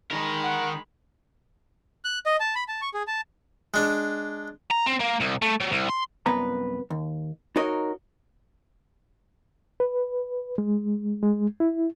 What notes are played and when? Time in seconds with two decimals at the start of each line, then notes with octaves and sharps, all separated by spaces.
0.11 D#3 G#3 A#4 B5
0.43 F#5
2.05 F#6
2.26 D#5
2.40 A5
2.55 B5
2.68 A5
2.81 C#6
2.94 G#4
3.08 A5
3.74 G#3 D4
4.70 A#5
4.86 C4
4.99 A#3
5.20 C2
5.42 A3
5.61 F#3
5.73 C2
5.90 C6
6.26 C2 F#2 B3 B4 A#5
6.90 D#2
7.56 D#4 F#4 A#4 C#5 D#5
9.80 B4
10.58 G#3
11.23 G#3
11.60 E4